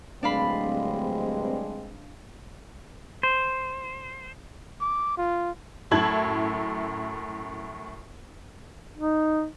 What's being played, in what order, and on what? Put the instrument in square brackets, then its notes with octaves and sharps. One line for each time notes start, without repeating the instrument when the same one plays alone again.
[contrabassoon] D1 [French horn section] G2 G#3 C4 [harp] D4 F5 B5
[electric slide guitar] C5
[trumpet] D6
F4
[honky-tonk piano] F#2 A2 E4 A5 G#6 F#7
[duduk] D#4